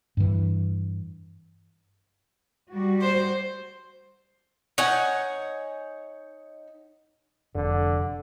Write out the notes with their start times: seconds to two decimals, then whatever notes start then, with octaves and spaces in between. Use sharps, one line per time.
0.17 G2 E3
2.71 G3 F#4
3.02 C5
4.78 D#4 C#5 F#5 G#5
7.55 F1 D3